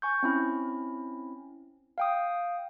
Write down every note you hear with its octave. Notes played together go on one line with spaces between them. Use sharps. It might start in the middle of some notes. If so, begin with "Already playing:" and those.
G#5 C#6 G6
C4 C#4 E4
F5 G5 D#6